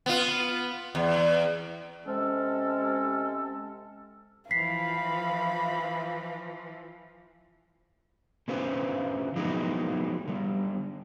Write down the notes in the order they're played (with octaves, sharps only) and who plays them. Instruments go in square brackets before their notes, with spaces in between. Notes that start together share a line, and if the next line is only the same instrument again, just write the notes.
[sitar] B3 F4
E2
[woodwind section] C3 G#3 C#4 A4
[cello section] E3 F3 [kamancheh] F5 B5 [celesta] B6 C7
[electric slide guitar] D3 C#4 F4 B4 C5
F3 F#3 G#3 B3 D#4 E4
D3 G3